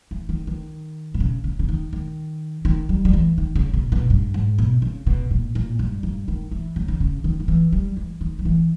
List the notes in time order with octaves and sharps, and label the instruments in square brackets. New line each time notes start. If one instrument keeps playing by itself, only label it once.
[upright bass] E3
D#3
D#3
B2
C#3
C#3
C#3
D#3
D#3
D#3
G3
G3
E3
D#3
C#3
B2
B2
G2
G#2
B2
C#3
B2
A#2
A#2
G2
G2
D#3
E3
C#3
D#3
C#3
D#3
D#3
E3
G3
E3
D#3
G3
E3